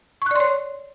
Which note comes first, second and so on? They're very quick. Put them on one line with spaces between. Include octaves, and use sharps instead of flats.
C#6 F#6 D5 C6 C#5